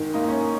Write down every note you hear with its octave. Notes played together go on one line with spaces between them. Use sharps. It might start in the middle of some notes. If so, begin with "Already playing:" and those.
Already playing: G#2 D#3
A#3 D#4
C#4